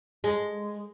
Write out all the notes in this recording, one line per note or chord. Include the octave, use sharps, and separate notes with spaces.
G#3